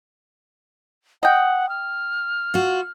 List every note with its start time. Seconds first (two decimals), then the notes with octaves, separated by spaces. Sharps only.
1.23 D#5 F#5 G5
1.69 F6
2.54 F4 F#4